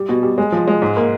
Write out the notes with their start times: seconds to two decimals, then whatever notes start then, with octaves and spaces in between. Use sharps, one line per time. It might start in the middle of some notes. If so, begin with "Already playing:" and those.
Already playing: G3
0.09 B2
0.23 G3
0.38 G#3
0.52 F3
0.67 G#3
0.82 G#2
0.97 A#3